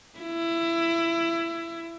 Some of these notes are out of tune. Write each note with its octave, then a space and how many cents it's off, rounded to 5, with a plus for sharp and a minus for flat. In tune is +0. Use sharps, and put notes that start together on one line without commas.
E4 +20